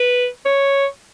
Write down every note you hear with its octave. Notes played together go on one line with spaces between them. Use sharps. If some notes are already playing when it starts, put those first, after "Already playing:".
Already playing: B4
C#5